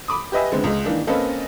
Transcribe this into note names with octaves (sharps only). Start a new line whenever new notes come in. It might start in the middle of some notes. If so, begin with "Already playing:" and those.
B5 D6 D#6
G4 B4 D#5 E5 G#5
D3 G#3 B3 C4
C#2 G#3
D#3 E3 A#3 D4
A#3 C4 C#4 A4 B4 D#5